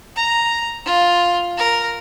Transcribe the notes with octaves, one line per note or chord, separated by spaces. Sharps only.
A#5
F4
A#4